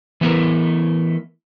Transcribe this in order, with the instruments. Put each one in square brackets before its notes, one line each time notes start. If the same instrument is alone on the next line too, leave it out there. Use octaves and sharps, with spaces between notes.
[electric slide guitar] E3 A3 B3 E4 A#4